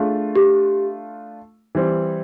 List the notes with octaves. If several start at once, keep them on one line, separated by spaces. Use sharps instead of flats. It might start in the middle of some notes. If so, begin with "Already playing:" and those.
Already playing: A3 D4 F4 G#4
G4
E3 G3 C4